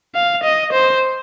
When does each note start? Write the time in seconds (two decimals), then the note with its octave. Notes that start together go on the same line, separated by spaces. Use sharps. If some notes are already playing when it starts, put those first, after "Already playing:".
0.15 F5
0.43 D#5
0.73 C5